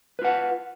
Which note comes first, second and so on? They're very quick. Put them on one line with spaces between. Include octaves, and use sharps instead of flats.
B4 F4 F#5